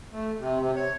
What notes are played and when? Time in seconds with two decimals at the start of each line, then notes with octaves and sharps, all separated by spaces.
0.13 A3
0.40 C3
0.60 C3
0.76 C#5